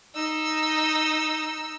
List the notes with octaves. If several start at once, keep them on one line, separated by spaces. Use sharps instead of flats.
D#4 E6